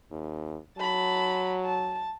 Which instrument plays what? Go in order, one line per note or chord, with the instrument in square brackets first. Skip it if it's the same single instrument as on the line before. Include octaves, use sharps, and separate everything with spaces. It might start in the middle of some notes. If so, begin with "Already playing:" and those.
[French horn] D#2
[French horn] F#3 [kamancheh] A5 B5
[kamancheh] A5